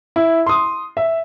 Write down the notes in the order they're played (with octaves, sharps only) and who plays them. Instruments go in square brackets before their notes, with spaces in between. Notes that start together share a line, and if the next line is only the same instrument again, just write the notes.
[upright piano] E4
C6 D#6
E5